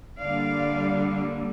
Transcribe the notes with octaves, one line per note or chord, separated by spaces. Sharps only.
D3 G3 A#3 D5 F5